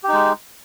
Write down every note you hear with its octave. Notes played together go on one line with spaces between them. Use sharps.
G#3 D#4 G4